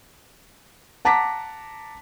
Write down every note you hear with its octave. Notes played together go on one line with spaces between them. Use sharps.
F#5 A5 A#5 D6 B6